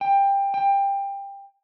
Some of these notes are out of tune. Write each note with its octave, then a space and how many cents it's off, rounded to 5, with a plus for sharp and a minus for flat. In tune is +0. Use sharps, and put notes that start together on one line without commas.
G5 +20
G5 +20